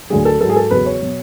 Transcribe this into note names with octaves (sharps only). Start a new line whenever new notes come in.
D2 D3 F#3 G#4
A4
G#2 F#3 A4
G#4
A4
E2 C#3 F#3 B4
C#5
B2 F#3